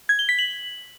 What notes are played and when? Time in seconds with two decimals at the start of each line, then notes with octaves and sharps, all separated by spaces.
0.09 G#6
0.19 G7
0.29 B6
0.39 F#7